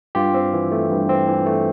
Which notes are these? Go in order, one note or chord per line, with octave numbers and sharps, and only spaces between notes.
G2 F4 G4
C4
E3
A3
G2
C4
E3
A3